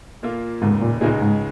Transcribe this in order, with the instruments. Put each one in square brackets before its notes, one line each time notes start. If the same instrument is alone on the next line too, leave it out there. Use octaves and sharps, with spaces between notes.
[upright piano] A#2 A#3 F4
[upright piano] F1 D#2 C#3 [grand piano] G#2
[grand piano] A#2
[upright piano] C#2 C#3 G#3 D#4 G#4 [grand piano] A#2
[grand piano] G#2